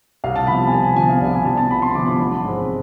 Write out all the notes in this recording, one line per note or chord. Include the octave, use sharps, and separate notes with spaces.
C2 F5
A5
C3 F3 B3 B5
G#5
C2 A5
G#5
C3 F3 B3 G#5
F5
C2 D5
G#5
C3 F3 B3 A5
A5
C2 B5
C6
C3 F3 B3 D6
C6
A1 B5
G#2 G#3 C4